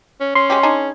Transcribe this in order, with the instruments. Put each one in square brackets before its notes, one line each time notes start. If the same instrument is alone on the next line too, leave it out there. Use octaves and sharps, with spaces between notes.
[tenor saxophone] C#4
[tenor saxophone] C#4 [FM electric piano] C6
[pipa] G#3 F#4 G4
D4 D#4 G#4